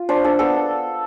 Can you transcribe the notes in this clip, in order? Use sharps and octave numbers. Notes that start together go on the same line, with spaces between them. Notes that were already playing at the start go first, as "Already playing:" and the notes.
Already playing: F4
D4 C5
D4 A4
B3 A4